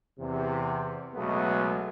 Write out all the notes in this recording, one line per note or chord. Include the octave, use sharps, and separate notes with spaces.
E2 C3
C#2 B2 F#3 G#3 A3 B3